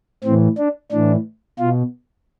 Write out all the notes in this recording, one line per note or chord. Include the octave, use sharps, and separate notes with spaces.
A2 E3 C4
D4
A2 E3 D4
B2 F4